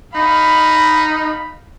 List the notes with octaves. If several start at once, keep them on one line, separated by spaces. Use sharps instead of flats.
D#4 F5 B5